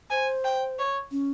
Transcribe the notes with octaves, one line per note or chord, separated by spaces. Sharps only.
C5 G#5
G5
C#5
C#4